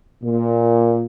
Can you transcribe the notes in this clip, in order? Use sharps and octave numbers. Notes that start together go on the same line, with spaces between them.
A#2